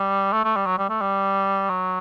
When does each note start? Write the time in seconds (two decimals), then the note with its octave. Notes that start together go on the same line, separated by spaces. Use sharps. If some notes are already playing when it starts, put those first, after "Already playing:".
Already playing: G3
0.33 A3
0.45 A3
0.56 G3
0.67 F#3
0.78 G3
0.89 A3
1.01 G3
1.70 F#3